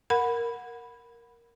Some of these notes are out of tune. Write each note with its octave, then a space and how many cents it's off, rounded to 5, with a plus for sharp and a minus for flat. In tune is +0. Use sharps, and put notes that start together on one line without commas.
A#4 +0 F#5 -15 B5 +0